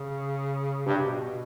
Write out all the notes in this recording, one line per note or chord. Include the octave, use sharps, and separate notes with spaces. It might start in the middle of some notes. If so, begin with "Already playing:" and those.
Already playing: C#3
G2 C3
B2
B2